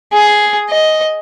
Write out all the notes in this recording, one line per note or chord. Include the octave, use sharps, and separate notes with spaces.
G#4
D#5